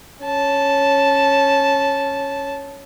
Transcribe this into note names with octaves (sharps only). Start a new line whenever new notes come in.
C#4 A5